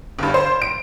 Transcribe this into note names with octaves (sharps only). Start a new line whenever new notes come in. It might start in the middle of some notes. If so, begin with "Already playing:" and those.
G1 G2
C5
D7